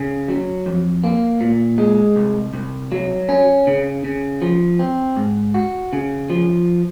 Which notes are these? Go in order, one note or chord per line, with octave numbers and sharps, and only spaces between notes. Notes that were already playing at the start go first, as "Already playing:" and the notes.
Already playing: C#3
F#3
F2
A#3
A#2
G#3
C2
C2
F#3
C#4
C#3
C#3
F3
C4
G#2
F#4
C#3
F3